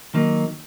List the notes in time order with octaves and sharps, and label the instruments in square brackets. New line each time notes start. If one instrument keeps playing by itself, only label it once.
[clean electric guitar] D#3 F#3 A#3 D#4